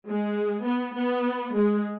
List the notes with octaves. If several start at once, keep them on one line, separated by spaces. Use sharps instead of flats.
G#3
B3
B3
G#3